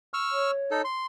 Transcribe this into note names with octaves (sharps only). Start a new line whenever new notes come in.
C#6 E6 F6
C#5
D#4 A4
C6